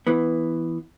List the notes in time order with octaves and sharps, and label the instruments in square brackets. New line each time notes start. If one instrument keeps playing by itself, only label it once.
[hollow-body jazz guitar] E3 B3